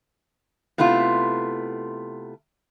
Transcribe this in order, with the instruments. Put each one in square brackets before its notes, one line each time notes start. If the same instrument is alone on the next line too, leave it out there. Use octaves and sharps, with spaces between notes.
[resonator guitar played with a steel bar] C3 A3 B3 E4 F4